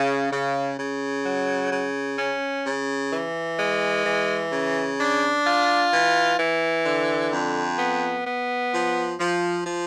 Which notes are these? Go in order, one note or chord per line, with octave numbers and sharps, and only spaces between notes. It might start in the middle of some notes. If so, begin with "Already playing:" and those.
Already playing: C#3
C#3
C#3
F#3
C#3
C#4
C#3
E3
G#3
E3
C#3
D4
F4
E3
E3
D3
F2
B3
B3
F3
F3
F3